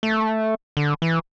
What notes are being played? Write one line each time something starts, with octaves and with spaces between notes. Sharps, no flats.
A3
D3
E3